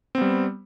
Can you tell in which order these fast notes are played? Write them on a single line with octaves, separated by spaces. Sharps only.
C4 B3 G3